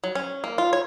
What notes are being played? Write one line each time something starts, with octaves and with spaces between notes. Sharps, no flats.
F#3
C#4
A#3
F4
C#5